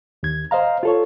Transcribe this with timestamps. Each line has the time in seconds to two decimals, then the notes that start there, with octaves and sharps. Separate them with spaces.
0.23 D#2 G#6
0.51 C5 D#5 F5 A#5
0.83 F4 A4 C#5